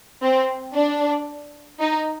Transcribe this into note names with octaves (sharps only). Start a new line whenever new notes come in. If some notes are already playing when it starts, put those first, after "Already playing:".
C4
D4
D#4